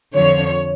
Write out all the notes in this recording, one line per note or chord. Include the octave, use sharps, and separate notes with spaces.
F2 D3 F3 C#5